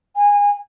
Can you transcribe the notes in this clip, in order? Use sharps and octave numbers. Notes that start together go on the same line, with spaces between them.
G#5